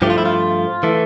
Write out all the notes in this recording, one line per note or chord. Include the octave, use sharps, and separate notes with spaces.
G2 F3 A3 G4
F4
E4
F4
E3 A3